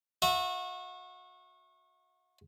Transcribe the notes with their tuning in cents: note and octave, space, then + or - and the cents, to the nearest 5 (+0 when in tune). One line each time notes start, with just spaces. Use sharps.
F#4 -30 E5 -5